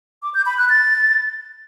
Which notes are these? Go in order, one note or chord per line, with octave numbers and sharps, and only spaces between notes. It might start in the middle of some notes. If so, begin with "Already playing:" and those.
D6
G6
B5
F#6
A6